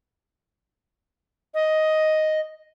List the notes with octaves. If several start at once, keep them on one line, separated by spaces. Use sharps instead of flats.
D#5